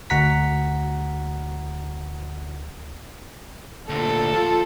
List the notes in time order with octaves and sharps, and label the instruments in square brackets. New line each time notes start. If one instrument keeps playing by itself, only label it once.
[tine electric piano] D2 F#4 F#5 A#5 B6
[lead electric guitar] D2 A#2 [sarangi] A4
[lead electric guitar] F3 F4